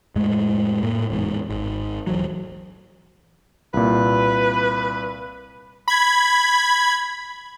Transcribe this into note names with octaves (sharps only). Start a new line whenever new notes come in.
F2 A2 G#3 A3
A2 A#3
F1 E2 G#2
G#1
D#1 E3 F#3
C2 A#2 B4
B5 G#6